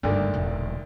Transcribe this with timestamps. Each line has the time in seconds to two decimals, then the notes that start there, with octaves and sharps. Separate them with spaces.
0.03 F#1 D2 G2 D3 D#3
0.34 E1 A#1